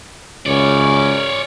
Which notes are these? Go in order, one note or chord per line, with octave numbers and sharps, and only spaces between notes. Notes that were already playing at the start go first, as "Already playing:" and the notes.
C#2 F#2 C#4 C#5 D5